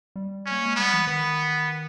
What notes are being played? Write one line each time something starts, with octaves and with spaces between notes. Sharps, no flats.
G3
C#4
A#3
G#3
G3 B3
E3
D#3 B3